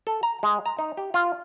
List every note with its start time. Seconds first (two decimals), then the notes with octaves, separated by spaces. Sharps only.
0.07 A4
0.23 A#5
0.43 G#3
0.66 A#5
0.79 D#4
0.97 G4
1.14 F4